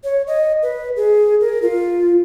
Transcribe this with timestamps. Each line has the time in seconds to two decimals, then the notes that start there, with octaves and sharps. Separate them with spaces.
0.04 C#5
0.27 D#5
0.63 B4
0.96 G#4
1.41 A#4
1.62 F4